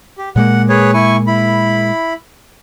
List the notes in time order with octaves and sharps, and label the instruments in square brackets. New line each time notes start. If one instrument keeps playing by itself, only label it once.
[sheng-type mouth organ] G4
[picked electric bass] A#2 G#3 A#3 [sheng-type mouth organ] F#5
[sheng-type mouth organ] G#4 B4 C#5
E4 G#5 C#6
E4 B5